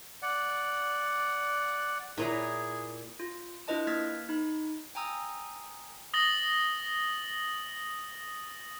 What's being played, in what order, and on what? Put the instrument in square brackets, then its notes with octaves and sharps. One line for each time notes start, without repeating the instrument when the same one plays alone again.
[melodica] D5 F#5
[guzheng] A#2 A#5 [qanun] E4 B4 C#5 [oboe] G#4
[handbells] F4
D4 E4 F4 B4 D#5 A5
A#3 B4 F6 G#6 A6 B6
D#4 B5
G5 G#5 A#5 D#6 E6
[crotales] D#6 A6 A#6 F#7 G7